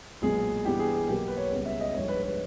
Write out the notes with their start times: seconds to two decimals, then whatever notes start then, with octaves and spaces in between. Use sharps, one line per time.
0.22 B1 A#2 G#3 B3 G#4
0.65 G2 E3 G3 B3 G4
0.79 G#4
0.94 G#4
1.08 B1 B2 A#3 G4
1.28 B4
1.37 C#5
1.51 C#2 C#3 G3 B3
1.65 E5
1.80 D#5
1.94 A#1 G#2 G3 A#3 C#5
2.08 B4
2.23 B4